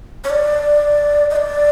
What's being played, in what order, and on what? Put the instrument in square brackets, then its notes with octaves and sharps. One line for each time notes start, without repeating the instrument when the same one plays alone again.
[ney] C#5
D5
D#5
D5